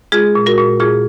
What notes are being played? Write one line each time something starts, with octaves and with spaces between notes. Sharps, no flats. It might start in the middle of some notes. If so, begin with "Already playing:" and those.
G#3 F4 G#4
A#2
F#4 A#4
A#2
A#2 F4 G#4